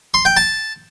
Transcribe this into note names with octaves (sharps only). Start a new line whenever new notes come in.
C6
G5
A5